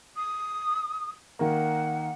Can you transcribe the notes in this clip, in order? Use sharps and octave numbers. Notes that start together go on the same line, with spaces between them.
D#6
D#3 A#3 F#5